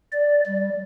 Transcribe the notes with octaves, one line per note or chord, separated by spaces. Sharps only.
D5
G3